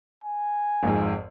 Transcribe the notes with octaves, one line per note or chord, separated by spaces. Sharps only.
G#5
G#1 F2 G#2